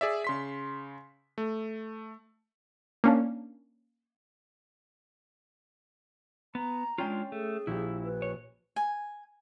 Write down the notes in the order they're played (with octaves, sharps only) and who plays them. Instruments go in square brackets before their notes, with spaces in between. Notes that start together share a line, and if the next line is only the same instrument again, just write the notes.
[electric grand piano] G#4 D5 E5
C#3 C6 B6
A3
[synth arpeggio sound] A#3 C#4 D4
[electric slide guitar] B3 [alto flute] A#5
[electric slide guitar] G#3 D4 F4 [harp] C#4 G5 D#7
[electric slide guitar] A3 [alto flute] G#4
[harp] A#1 G4 [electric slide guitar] E4
[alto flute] B4
[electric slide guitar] C#5
[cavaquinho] G#5